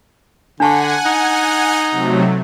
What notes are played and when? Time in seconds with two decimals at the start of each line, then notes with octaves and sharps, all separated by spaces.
0.60 D3 D4 F#5 G#5 A5 C#6
1.05 D#4
1.91 C3 F#3 A3